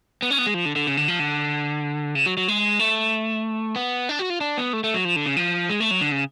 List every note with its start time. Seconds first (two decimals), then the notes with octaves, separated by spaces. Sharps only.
0.22 B3
0.31 C#4
0.39 B3
0.46 G#3
0.54 F3
0.65 D3
0.76 D3
0.87 C#3
0.97 D3
1.08 F3
1.19 D3
2.15 C#3
2.26 F#3
2.37 F#3
2.48 G#3
2.79 A3
3.76 B3
4.09 D4
4.19 F#4
4.30 F4
4.41 D4
4.57 B3
4.73 A3
4.84 A3
4.94 F#3
5.05 F3
5.16 D3
5.26 C#3
5.37 F3
5.70 G#3
5.80 A3
5.91 F#3
6.01 D3
6.12 C#3